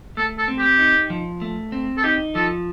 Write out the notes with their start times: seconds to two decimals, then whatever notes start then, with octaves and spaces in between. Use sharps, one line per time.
0.17 A3 A4
0.38 A4
0.48 C4
0.58 G4
0.79 D#4
1.10 F3
1.42 A3
1.72 C4
1.97 A4
2.03 D#4 G4
2.35 F3 A4